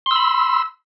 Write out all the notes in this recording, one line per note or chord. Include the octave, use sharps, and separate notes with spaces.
B5 C6 E6